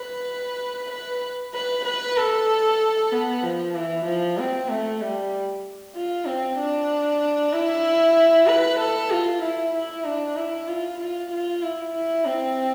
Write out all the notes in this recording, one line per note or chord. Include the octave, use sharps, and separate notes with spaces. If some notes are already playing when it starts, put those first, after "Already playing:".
Already playing: B4
B4
B4
B4
A4
B3
F3
E3
F3
C4
A3
G3
F4
C4
D4
E4
B4
A4
F4
E4
E4
D4
E4
F4
F4
F4
E4
E4
C4